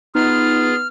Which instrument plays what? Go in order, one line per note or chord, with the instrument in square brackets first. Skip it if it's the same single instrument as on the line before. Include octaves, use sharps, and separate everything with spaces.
[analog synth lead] B3 [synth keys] D#4 [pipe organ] F4 G#4 [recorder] F6